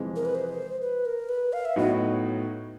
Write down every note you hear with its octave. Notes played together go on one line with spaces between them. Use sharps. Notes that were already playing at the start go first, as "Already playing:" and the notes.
Already playing: F2 C3 E3 G#3
A#4
B4
C5
B4
A#4
B4
F5
E5
A2 F#3 B3 D#4 F#4 D#5